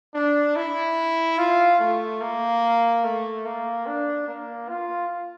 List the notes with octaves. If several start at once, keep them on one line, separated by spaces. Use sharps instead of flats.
D4
E4
F4
A3
A#3
A3
A#3
D4
A#3
F4